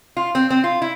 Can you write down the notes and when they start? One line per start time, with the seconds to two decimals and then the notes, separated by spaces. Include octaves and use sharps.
0.17 F4
0.35 C4
0.50 C4
0.64 F4
0.82 E4